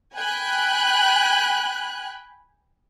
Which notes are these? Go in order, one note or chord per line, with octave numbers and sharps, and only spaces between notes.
G5 G#5 B5 F#6